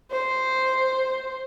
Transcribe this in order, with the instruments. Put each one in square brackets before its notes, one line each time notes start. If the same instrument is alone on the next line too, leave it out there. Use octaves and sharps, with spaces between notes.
[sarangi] C5